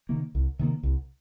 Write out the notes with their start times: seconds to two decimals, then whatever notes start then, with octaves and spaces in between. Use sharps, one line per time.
0.09 C3 D#3 A#3
0.35 C2
0.59 C3 D#3 A#3
0.83 C2